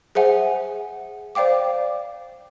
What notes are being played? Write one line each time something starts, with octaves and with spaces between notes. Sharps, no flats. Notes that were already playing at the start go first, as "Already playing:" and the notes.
G#4 C5 E5 F#5 G#5
C5 D5 F5 G5 D6